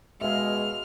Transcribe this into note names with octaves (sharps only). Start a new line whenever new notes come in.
B2 G#3 E5 F5 F6